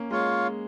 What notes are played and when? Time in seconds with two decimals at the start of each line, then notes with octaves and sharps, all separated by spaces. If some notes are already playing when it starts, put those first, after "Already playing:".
Already playing: A#3 C#4
0.11 G#3 F4 C#5 F5